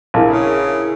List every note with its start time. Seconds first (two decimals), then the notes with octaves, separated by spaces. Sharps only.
0.14 A#1 E4 G#4 A#4
0.31 C#3